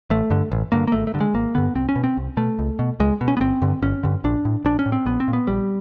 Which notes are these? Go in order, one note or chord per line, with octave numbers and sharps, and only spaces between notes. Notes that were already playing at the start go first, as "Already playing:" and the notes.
A1 A3
G2 D3
A1
G2 D3 A#3
A#3
G#1 A3
A3
G2 D3
G#3
G#1 A#3
G2 D3 B3
C2 C4
C#4
B2
C4
C2
B2 A3
C#2
B2
C#2 G#3
B2
C#4
B3
G1 C4
G2 D3
G1 C#4
G2 D3
A#1 D4
A2
A#1 D4
C#4
A2
C4
A#1 B3
C4
A#2
B3
A#1 G3